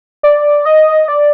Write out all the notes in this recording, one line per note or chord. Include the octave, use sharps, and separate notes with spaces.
D5
D#5
D5